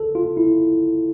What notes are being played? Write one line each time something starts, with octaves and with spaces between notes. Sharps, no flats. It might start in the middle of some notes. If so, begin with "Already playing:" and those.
Already playing: A4
F4
E4